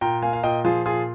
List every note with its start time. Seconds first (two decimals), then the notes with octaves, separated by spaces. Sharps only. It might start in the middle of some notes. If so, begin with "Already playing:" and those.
0.01 A#2 G5 A#5
0.22 A#3 F5 G#5
0.33 F5
0.43 A#2 D#5 G5
0.64 F3 F4 G#4
0.86 A#2 F4 G#4